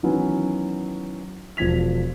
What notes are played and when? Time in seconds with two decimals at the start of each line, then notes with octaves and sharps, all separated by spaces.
0.03 D#3 E3 F#3 B3 C#4
1.57 E1 F3 G#6 B6 F7